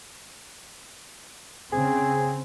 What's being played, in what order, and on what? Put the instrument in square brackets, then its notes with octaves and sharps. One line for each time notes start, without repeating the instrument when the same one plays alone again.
[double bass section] C#3 C4 [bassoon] G#4